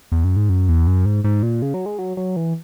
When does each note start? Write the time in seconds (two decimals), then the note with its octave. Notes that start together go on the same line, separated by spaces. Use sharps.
0.12 E2
0.24 F#2
0.36 G#2
0.49 F#2
0.69 E2
0.87 F#2
1.05 G#2
1.24 G#2
1.43 A#2
1.62 C#3
1.74 F#3
1.86 G#3
1.98 F#3
2.17 F#3
2.36 E3